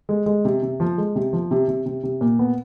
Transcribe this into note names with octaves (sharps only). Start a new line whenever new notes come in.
G#3
G#3
C3
C3
F3
G#3
C3
F3
C3
C3
C3
C3
A#2
B3